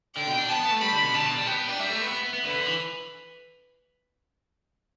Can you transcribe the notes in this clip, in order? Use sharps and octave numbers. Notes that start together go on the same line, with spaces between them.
D3 G5
B2
D4
B3 A5
B3
A3
G3 B5
D3
B2
D3 A5
B2
G3
B3 G5
B3
D4
G3 E5
A3
B3
B3
B3
B3
D3 B4
D3
E3